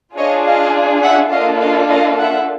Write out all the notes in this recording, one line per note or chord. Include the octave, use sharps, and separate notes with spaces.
D4 F4 G#4 C#5 D#5
D#5 F5
E5 F#5
A#3 D4 F4 A4 D#5 F5
D#5 F5
D#5 F5
E5 F#5